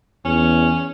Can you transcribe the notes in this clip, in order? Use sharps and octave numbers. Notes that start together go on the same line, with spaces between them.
E2 C#4